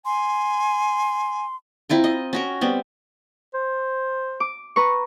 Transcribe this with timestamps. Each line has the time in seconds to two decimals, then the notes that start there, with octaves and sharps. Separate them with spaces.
0.05 G#5 C6
1.89 C4 E4 F4 A#4
2.04 D#5
2.33 C#4 F#4 A#4
2.61 G3 B3 C4
3.54 C5
4.40 D6
4.76 B4 A#5 C#6